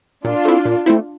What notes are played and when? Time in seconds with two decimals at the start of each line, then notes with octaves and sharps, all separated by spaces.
0.25 A#2 D4 F4
0.45 A3 C4 E4
0.65 A#2
0.86 A3 C4 E4